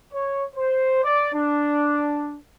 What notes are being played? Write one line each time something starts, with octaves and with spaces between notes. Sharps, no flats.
C#5
C5
D5
D4